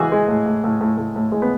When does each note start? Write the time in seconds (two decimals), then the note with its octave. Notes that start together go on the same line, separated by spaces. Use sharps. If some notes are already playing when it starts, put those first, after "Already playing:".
Already playing: E3 G#3 F#4 G#4
0.12 G#3
0.28 A2
0.46 A2
0.64 A2
0.81 A2
0.97 A2
1.16 A2
1.32 G#3
1.42 B3